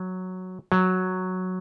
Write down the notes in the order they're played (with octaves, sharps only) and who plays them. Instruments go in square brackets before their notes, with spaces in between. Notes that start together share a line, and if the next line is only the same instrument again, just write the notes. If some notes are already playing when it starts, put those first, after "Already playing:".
Already playing: [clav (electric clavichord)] F#3
F#3